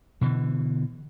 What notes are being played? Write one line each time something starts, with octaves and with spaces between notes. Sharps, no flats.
B2 D3 E3